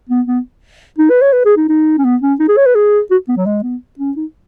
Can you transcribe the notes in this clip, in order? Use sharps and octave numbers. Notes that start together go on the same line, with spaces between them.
B3
B3
D#4
B4
C#5
B4
G#4
D#4
D#4
C#4
B3
C#4
D#4
G#4
C#5
B4
G#4
F#4
B3
F#3
G#3
B3
C#4
D#4